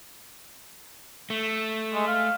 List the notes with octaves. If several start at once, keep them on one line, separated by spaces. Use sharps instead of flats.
A3
G#3
F5